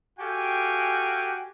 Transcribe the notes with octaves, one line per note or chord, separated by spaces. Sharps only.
F#4 G4 A4 F5 G5 G#5